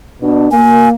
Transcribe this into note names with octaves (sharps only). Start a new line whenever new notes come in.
B2 D4
A#3 G#5